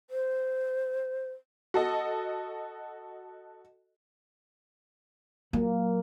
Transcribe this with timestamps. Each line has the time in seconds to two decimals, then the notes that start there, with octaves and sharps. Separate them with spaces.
0.10 C5
1.74 F#4 A4 D#5
5.53 F#3 A#3